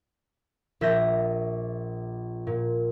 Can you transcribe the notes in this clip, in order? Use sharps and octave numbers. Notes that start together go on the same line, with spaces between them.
A#1 E5 G6 A#6
A#2